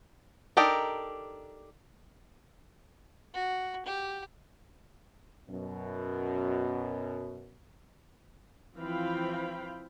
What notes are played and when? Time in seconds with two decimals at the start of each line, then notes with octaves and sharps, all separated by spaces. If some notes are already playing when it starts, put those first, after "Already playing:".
0.57 D4 D#4 G4 A4 A#4
3.34 F#4
3.86 G4
5.48 F#2 B2
8.78 E3 F3 C4 F5 G5 B5